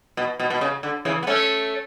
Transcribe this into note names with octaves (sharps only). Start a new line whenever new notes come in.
B2
B2
B2
C#3
D3
C#3 E3
B3
A3 C#4